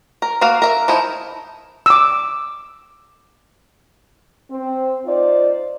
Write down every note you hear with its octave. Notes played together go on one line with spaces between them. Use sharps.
A#4
A#3 F#4 F5
A#4 E5
F3 D#4 E4
D6 E6
C4
D#4 F4 C5 D5